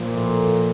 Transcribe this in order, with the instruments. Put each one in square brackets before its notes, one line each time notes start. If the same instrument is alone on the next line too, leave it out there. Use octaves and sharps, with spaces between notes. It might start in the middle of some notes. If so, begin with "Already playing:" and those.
Already playing: [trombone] A#2 [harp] F3
[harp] A2
A#3